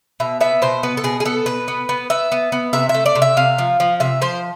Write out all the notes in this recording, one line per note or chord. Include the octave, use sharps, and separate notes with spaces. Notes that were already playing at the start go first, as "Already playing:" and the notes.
B2 E5
B3 E5
B2 C5
B3 B4
A4
B2 G#4
G#4
B3 A4
B2 B4
B3
B3
B3 E5
B3
B3
C3 E5
E5
A3
D5
C3
E5
C3 F5
F3
F3
C3 E5
F3 C5